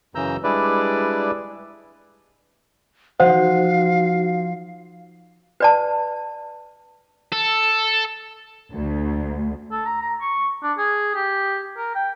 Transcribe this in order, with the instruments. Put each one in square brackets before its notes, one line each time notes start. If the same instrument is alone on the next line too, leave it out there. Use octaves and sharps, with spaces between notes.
[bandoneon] F#2 C#3 E3 A#5 E6 G6
G3 G#3 D4 E4 B4 D5
[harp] F3 [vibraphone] D#4 F#4 [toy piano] C5 F#5 [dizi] F5
[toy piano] B4 D5 A5
[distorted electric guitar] A4
[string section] D2
[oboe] A4
A#5
A#5
C#6
D4
G#4
G4
A#4
G5